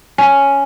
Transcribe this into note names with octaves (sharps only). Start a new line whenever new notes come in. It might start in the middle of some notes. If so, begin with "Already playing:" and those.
C#4